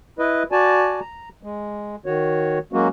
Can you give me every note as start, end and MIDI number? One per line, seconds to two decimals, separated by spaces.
0.19 0.43 64
0.19 0.43 71
0.19 0.43 75
0.52 1.00 66
0.52 1.00 74
0.52 1.00 80
0.52 1.00 81
1.01 1.29 82
1.43 1.96 56
2.06 2.59 51
2.06 2.59 66
2.06 2.59 73
2.73 2.88 54
2.73 2.88 56
2.73 2.88 58
2.73 2.88 61
2.73 2.88 66